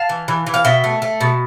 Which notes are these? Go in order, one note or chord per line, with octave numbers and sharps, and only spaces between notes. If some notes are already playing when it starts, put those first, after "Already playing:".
Already playing: F5 A5
E3
E3
E3
F5
B2 E5 G5
A3
A3
B2